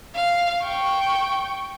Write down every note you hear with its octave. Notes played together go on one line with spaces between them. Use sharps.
F5
G5 C#6